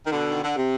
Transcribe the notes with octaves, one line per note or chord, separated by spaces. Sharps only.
D#3
B2 D3
D#3
D3
C3